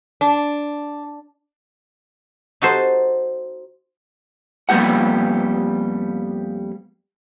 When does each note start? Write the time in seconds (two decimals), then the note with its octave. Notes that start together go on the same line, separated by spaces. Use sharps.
0.21 D4
2.62 D#4 F#4 A4 C5
4.69 F2 G3 A#3 B3 G4 F#5